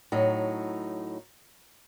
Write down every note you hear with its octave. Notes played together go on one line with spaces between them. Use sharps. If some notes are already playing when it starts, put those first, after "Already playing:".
A2 F#3 D#4